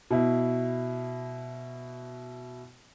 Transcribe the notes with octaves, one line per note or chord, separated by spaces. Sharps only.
B2 E4